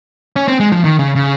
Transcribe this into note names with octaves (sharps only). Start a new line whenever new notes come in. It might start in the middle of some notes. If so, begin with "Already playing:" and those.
C#4
C4
G#3
F3
D#3
C#3
C#3